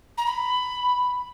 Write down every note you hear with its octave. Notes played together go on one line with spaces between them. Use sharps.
A#5
B5